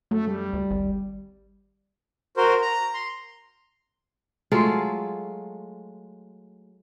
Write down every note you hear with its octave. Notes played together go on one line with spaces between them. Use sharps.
F#2 A3
G3
D2
G#1
F#4 A#4 C5
A#5
C6
F#3 G#3 A3 F4